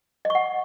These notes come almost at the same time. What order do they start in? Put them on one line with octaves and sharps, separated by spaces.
D#5 C#6 F#5